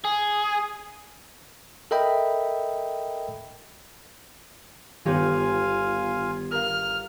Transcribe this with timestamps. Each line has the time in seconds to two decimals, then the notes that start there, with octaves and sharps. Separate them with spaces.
0.04 G#4
1.91 A4 A#4 D#5 E5 G5 B5
5.06 G1 D#3 B3 F4 G4 C#5 F5 G#5
6.52 A#4 F5 F6